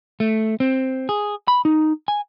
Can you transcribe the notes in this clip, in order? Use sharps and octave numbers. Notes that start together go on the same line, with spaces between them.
A3
C4
G#4
B5
D#4
G#5